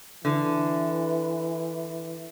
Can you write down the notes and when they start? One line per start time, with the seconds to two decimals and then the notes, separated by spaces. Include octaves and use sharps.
0.25 D3 E3